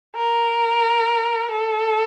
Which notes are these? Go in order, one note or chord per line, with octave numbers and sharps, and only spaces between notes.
A#4
A4